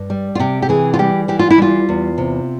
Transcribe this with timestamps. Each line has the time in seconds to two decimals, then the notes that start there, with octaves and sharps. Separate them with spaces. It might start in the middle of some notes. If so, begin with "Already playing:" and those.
Already playing: G2
0.10 G3
0.35 F4
0.40 C3 G4
0.62 G4
0.69 E3 G#4
0.94 F4
0.99 G3 G4
1.28 E3 G4
1.39 F4
1.50 E4
1.58 G3 F4
1.89 E2
2.18 C3